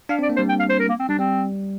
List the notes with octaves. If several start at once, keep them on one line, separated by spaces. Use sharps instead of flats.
D4 F5
C4 D5
A#3
C5
G3
G5
F5
C5
A#4
A#3
C4
G3 D4
G3 C4